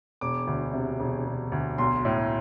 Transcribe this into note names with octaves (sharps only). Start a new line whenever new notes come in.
E1 D6
D2
C3
E1
E1
D2
B1 C6
A2